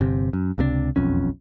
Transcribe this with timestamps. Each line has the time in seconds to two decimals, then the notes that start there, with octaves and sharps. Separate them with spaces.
0.01 G1 C3
0.33 F#2
0.58 C#2 C3 G3 D4
0.96 E1 B1 F2 C#4